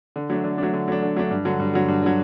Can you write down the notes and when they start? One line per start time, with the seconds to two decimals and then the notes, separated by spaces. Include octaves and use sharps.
0.16 D3
0.30 F#3 A3 D4
0.44 D3
0.58 F#3 A3 D4
0.73 D3
0.88 F#3 A3 D4
1.02 D3
1.17 F#3 A3 D4
1.31 G2
1.45 D3 F#3
1.59 G2
1.74 D3 F#3
1.88 G2
2.03 D3 F#3